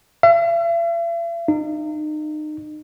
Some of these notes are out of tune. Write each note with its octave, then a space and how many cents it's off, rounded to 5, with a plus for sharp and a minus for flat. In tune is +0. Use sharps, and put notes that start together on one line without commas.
E5 +45
D#4 -30